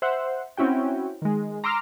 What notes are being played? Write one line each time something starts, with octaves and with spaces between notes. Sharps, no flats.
C5 E5 F#5
C4 C#4 E4 F#4 G5
D#3 G#3
A#5 C6 D6 E6 F6